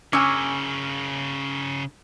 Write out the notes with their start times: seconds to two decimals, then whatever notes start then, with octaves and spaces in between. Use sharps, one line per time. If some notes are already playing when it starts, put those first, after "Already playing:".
0.13 C#3 C#4 A#4 G#5 D6 E6 G6